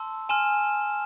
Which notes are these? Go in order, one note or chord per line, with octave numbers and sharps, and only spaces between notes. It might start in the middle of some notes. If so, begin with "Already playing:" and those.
Already playing: A5 C6 E6
G#5 C6 F6 E7